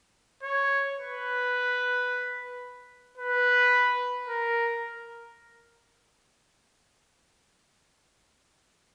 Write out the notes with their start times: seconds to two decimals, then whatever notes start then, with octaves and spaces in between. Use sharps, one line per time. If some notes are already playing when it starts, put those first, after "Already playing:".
0.43 C#5
0.98 B4
3.17 B4
4.27 A#4